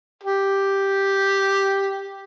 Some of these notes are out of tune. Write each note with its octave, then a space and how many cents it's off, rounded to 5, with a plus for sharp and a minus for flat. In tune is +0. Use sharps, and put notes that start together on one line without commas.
G4 +0